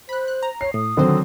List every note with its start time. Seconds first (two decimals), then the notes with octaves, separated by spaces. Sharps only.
0.09 C5 B5 F#6
0.28 F#6
0.43 A#5
0.61 C#5 C7
0.74 A2 D#6
0.97 D3 D#3 F#3 C4 C5